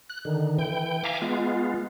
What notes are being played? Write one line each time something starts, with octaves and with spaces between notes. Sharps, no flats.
F#6
D3 D#3
E3 G5
E5 F5 G#5 A#5 D6
G#3 B3 F4